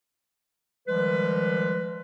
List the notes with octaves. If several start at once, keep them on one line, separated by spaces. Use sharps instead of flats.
D#3 F3 G3 G#3 B4